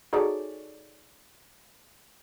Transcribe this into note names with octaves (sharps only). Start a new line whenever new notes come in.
D#4 F#4 G#4 A4 C#5 D5